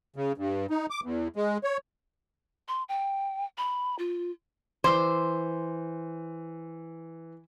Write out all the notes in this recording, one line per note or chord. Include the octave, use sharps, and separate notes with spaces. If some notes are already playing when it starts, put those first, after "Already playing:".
C#3
G2
D#4
D6
E2
G#3
C#5
C6
G5
B5
F4
E3 C5 C6 D6 E6